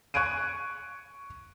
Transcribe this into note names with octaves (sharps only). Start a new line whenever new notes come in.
C#6 F#6 G#6 D7 D#7